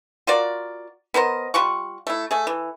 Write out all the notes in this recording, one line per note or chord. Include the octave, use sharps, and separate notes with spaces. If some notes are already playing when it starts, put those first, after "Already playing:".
F4 F#4 A#4 D5
B3 A#4 C5 D#5
G3 F4 F#5 C#6
A3 E4
A3 G#4
E3